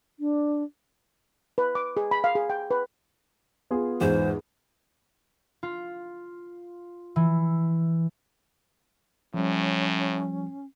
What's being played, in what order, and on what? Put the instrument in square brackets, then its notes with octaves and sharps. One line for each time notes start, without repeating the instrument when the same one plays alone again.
[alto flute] D4
[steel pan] B4
D6
G#4
B5
F5
G#4
G5
B4
[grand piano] B3 F4 G#4
[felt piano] E2 G#2 [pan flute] C5
[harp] F4
E3
[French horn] A2 [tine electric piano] F3 G3 [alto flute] C#4